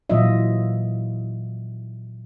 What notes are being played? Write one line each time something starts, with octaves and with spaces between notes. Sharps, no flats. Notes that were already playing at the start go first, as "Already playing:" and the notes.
A#2 E3 F#3 F4 D#5 E5